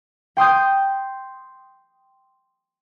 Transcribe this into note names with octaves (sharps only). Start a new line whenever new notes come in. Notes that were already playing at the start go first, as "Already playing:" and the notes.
G5 C6 D#6 G6